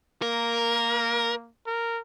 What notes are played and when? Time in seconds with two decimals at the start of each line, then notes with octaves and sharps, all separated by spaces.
0.22 A#3 A#4
1.66 A#4